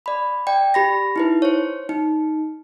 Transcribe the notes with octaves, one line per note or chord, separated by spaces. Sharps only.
D5 B5
D5 G5
G4 B5 A#6
D#4 E4 B4
C5 C#5
D#4